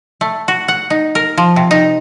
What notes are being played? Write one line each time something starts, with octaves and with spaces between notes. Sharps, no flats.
A3
F#4
F#5
D#4
A#4
F3
C3
D#4